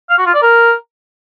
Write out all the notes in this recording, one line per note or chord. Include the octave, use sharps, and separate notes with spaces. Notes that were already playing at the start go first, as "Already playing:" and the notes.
F5
F#4
F4
D5
A#4